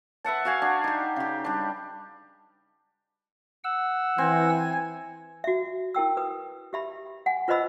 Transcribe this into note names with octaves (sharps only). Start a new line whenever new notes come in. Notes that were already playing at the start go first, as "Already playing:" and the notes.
B4 E5 F#5 A5
F#4 F5 G#5
D4
D#4 G4
C#3 G4
G3 D4
F#5 E6
E3 C4 G#5
F#4 E5
E4 A#4 G5 E6
B4 D#6
G4 E5 B5
F#5 G#5
F4 B4 C5 D#5 B5 E6